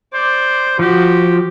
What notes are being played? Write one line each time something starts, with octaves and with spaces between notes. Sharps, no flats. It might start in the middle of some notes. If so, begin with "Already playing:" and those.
C5 D5
F3 F#4 G4